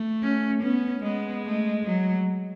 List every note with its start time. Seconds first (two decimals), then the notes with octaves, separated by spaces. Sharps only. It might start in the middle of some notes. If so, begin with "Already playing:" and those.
Already playing: A3
0.22 C#4
0.62 B3 C#4
1.03 G#3 B3
1.45 A3
1.85 F#3